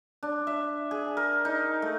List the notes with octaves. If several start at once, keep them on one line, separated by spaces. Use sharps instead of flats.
D4
E5
G#4
A#4
D#4
A3